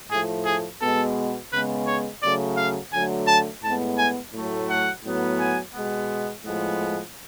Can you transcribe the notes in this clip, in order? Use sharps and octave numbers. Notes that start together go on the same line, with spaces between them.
A2 F3 A3 G#4
G#4
B2 G#3 B3 A4
C#3 G#3 B3 B4
C#5
C#3 F#3 A3 D5
F5
D3 F#3 A3 G#5
A5
A2 G#3 B3 A5
G#5
A2 F#3 A3
F#5
A2 F#3 B3
G#5
B2 G#3 B3
A2 F3 G#3 B3